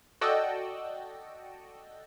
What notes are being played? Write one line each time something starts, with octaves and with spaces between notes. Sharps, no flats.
F#4 A4 D5 D#5 G5 E6